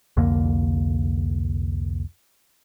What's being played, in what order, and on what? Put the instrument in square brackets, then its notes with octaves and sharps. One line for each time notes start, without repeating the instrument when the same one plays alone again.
[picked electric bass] C2 F2 D3 A#3